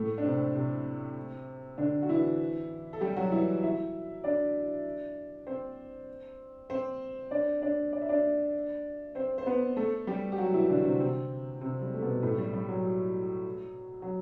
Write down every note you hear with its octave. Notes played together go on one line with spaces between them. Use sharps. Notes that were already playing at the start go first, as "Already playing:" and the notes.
Already playing: A2 A3
D4
C3 C4
C3 C4
D3 D4
F#4
E3 E4
A4
G3 G4
F#3 F#4
E3 E4
E4 E5
D4 D5
C4 C5
C4 C5
D4 D5
D4 D5
D5
E5
D4 D5
C4 C5
C5
B3 B4
A3 A4
G3 G4
G4
F#3 F#4
E3 E4
D3 D4
C3 C4
C3 C4
C3 C4
G3
A3
B2 B3
A2 A3
G3
G3
F#3
F#3